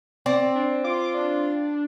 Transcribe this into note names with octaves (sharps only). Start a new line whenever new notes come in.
C4 D5
D4
F4 D6
D4